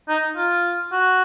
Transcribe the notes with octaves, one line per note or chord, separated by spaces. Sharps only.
D#4
F4
F#4